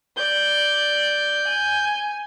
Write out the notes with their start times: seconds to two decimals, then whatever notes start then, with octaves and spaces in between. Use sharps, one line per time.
0.17 D5 G6
1.48 G#5